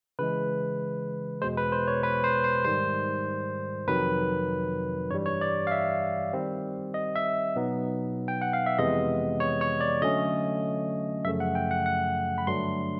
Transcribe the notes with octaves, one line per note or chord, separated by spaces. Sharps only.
C#3 E3 G#3 B4
E2 B2 G#3 C5
B4
C5
C#5
B4
C5
C5
G#2 D#3 G3 C5
F2 C3 D#3 F#3 B4
G2 E3 G3 C#5
C#5
D5
F5
E5
D#3 G3 C4
D#5
E5
B2 F#3 B3 D#4
G5
F#5
F5
E5
F2 C3 E3 G#3 B3 D#5
C#5
C#5
D5
D3 F#3 A3 C#4 D#5
F#2 C#3 F3 A3 E5
F#5
G5
F#5
F#5
B5
G2 D3 F#3 A3 D4 C6